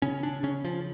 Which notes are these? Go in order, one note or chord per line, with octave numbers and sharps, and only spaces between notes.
C#3 C#4
D4
C#3 C#4
F3